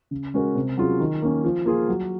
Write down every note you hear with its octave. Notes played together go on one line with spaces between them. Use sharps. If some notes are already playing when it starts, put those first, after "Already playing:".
C#3
G#3 C#4 F#4 A#4
C3
F#3 C#4 F4 G#4
D#3
A#3 C#4
F3
A#3 F4 G#4
F#3